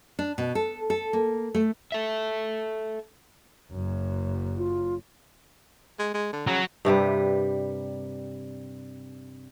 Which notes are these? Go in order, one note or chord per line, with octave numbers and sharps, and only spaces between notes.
D4
B2
A4
A4
A#3
A3
A4 E5
F#1 F#2
F4
G#3
G#3
D3
C#3 F#3
G2 C3 G3 B4